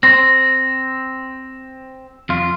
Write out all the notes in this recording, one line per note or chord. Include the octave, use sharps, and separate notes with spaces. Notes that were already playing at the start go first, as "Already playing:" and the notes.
C4 C5 A#6
F2 F4